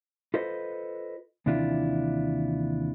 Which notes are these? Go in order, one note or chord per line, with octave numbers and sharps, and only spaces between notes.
F4 A4 B4 C5 D#5
D#2 C3 E3 D4 E4 F4